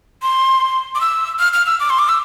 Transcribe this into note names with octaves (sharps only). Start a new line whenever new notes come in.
C6
D6
E6
F6
F6
E6
D6
C6
D6
E6